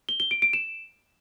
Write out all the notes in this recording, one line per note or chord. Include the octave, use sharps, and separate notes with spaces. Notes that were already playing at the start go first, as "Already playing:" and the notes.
G7
G7
D7
D7
E7